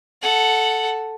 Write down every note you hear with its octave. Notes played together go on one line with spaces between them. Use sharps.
A4 F#5